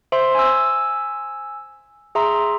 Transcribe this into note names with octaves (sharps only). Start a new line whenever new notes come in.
C5 E5 C6
G#5 E6
G#4 E5 A#5 C6